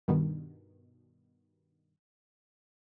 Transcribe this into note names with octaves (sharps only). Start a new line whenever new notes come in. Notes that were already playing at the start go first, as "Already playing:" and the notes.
G2 B2 D#3